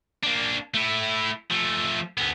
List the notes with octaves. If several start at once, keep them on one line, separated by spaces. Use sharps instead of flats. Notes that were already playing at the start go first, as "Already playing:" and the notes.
A#3 D4
A3 E4
F3 A3
D2 B3